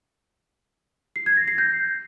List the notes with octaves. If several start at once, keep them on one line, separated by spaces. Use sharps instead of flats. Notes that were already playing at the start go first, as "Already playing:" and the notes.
C7
G#6
A#6
C7
G6